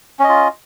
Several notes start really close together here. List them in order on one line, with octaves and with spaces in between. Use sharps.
C#4 D#5 F4